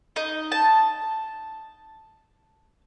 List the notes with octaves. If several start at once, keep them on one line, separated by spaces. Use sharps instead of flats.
D#4 D#5
A5